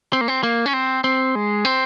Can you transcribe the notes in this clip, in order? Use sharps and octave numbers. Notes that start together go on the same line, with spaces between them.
C4
A#3
C4
A#3
C#4
C4
C4
G#3
C4